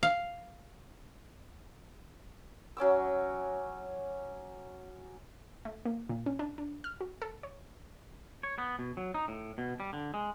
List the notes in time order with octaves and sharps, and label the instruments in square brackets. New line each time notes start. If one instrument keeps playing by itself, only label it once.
[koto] F5
[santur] F#3 C#4 D6 E6
[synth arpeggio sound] A3
A#3
A#2
C#4
D4
D4
F6
F#4
A4
C#5
[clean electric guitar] C#5
B3
B2
F#3
D#4
A2
B2
G3
D3
G#3